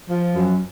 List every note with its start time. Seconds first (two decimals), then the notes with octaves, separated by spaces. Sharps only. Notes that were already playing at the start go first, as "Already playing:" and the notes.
0.10 F3
0.35 F#2